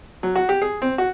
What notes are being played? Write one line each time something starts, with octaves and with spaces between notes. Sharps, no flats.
F#3
F#4
G4
G#4
C4
F#4